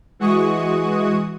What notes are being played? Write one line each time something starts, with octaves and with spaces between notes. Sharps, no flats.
E3 G#3 F#4 C#6 D#6